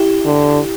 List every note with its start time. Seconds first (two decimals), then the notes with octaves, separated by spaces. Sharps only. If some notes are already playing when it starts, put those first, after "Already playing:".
Already playing: E4 G4
0.26 D3